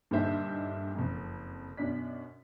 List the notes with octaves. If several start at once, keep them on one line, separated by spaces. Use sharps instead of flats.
G2 A#2 D3 D#4 C5 E5
F#1 F2
F#2 B2 D4 B6